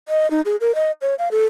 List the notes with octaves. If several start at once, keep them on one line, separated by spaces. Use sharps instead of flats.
D#5
D#4
G#4
A#4
D#5
C#5
F5
A4